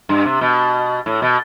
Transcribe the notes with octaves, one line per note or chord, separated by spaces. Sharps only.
G2
C3
B2
A2
B2